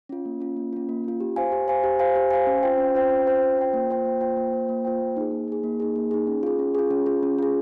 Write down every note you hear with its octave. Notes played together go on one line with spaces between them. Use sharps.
C#4 F4
A#3
C#4 F4
A#3
C#4 F4
A#3
C#4 F4
G4
C5 F5 G#5
G4
C5 F5 G#5
G4
C5 F5 G#5
G4
C5 F5 G#5
C#4
F4 C5 G5
C#4
F4 C5 G5
C#4
F4 C5 G5
C#4
F4 C5 G5
A#3
F4 C5 G5
A#3
F4 C5 G5
A#3
F4 C5 G5
A#3
F4 C5 G5
A#3
D#4 G#4
A#3
D#4 G#4
A#3
D#4 G#4
A#3
D#4 G#4
C#4
F4 G#4
C#4
F4 G#4
C#4
F4 G#4
C#4
F4 G#4